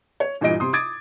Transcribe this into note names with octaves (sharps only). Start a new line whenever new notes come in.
C#5
G2 A#2 E3 D#4 D#5 D7
C3 C6 D#6
D6 D#6 G#6 A6 D7